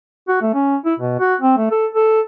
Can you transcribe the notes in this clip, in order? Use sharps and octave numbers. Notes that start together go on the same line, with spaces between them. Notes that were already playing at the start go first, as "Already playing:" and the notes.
F#4
A3
C#4
E4
B2
F#4
C4
A3
A4
A4